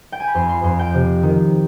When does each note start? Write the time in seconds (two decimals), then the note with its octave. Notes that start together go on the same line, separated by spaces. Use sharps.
0.12 G5
0.20 G#5
0.27 B5
0.34 F2 C6
0.49 C6
0.64 F2 C6
0.79 G5
0.94 C3
1.23 D#3